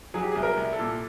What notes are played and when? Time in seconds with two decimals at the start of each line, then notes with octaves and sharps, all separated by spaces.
0.14 F#3 G#4
0.23 G4
0.31 C2 G#4
0.43 A#4
0.57 C2
0.73 A4
0.79 A#2